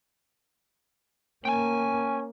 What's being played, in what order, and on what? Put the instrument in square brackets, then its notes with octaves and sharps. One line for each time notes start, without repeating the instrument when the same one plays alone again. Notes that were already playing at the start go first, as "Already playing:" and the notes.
[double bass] A#3 [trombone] C#4 [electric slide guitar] G5 G#5